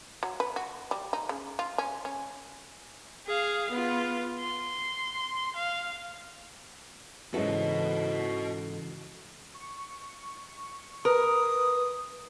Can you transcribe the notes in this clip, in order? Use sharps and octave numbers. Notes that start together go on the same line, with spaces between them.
F#3
B4
F#4
G3
D#4
C#3
F4
C#4
C#4
G#4 F5
B3 F4
C6
F5
G#2 C#3 E3 F#4 A4 D#5
C#6
A#4 B4 D#6